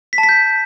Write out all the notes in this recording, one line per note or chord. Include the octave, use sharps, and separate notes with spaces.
B6
A5
B6
G6